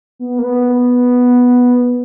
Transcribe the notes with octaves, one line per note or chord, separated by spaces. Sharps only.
B3
A#3
B3